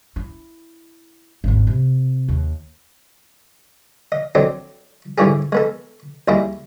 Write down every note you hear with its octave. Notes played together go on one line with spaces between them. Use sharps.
E4
G#1 D#2
C3
D#2
D#5
F#3 C4 D4 A4 D#5
G#2 D3 E3 G3 G4 G#4
G#3 B3 A4
D#2 G3 E4 G#4 D#5